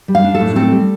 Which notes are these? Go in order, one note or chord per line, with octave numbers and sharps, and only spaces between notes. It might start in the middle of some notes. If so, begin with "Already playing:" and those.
G3
F5
D4
A4
A2
C4 A4
G3